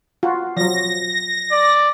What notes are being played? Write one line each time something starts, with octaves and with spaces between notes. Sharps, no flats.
F4 F#4
F3 F#3 A#6
D5